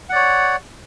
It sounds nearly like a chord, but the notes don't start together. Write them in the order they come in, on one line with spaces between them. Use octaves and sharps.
F#5 D5 C#5